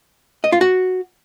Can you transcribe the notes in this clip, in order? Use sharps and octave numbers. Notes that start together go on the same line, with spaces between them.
D#5
F4
F#4